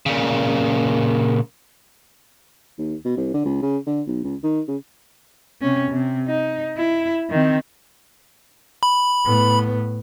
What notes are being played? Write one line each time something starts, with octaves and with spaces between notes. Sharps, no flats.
A#2 C#3
D#2
B2
C2
D3
C#2
C#3
D3
B1
C#2
D#3
C#3
C3 C#4
C3
D#4
E4
D#3 C4
B5
A2 B3